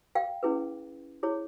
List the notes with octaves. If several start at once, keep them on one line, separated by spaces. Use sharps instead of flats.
F5 G5
C#4 E4 G#4 B4
E4 G#4 C#5